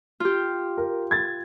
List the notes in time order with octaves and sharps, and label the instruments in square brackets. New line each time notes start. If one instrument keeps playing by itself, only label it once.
[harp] F4 G4
[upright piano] A#4
G#6 A6